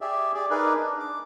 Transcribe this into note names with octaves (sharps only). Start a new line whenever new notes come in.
G4 G#4 D5 E5
G#4 D5
D#4 G#4 A#4 B4 D5
D4
D6